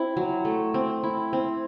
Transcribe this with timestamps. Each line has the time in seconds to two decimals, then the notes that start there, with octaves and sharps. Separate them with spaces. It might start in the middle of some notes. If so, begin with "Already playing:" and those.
Already playing: C4 E4
0.17 F#3
0.45 A3
0.74 C4
1.03 E4
1.33 C4